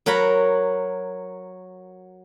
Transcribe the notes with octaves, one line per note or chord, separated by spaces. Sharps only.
F#3 A#4 C#5 F#5 B5